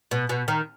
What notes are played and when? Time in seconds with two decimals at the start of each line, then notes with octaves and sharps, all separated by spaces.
0.11 B2
0.29 B2
0.48 D#3